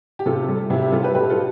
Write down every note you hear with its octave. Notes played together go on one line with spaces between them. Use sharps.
G4
C3 F4 A4
G3
C3 E4 G4
E4 G4
G3 F4 A4
G4 B4
B2 G4 B4
F4 A4